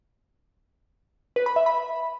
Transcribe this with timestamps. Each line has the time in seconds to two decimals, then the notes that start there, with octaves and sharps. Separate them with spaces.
1.36 B4
1.46 B5
1.56 E5
1.66 B5